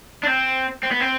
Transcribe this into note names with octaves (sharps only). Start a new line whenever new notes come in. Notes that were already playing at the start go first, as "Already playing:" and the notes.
D4
C4
C4
B3
C4